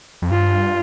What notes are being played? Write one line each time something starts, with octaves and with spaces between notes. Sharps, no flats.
F2
G2 F4